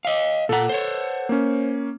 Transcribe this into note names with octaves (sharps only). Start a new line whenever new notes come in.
D#5 F5
A#2 A4 F#5 A#5
C5 C#5
A#3 C#4